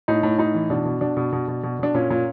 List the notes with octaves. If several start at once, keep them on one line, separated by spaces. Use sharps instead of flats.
A2 D#4
A2
A2 D#4
E3
B2 D4
B2
B2 D4
B2
B2
B2
B2
B2 D4
A#2 C#4
A#2